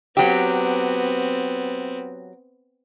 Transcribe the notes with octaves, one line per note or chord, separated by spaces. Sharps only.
F#3 B3 C4 G4